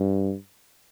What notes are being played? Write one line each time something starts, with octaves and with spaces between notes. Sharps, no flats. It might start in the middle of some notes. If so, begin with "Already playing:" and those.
Already playing: G2